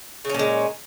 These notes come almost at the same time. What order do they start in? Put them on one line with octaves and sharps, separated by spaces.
C#3 C#4 A#2 G#3